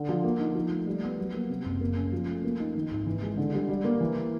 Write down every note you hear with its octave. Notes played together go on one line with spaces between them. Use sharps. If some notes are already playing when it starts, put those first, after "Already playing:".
Already playing: D3
F3
A#3
D#4
F3
A3
G3
B3
F#3
A#3
C3
F#1
A#3
C#4
F3
A3
A#3
D#4
D#3
G#1
E3
G#3
D3
G3
G3
A#3
E3